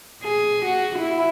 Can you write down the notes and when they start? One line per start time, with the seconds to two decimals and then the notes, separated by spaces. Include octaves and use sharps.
0.24 G#4
0.65 F#4
0.99 E4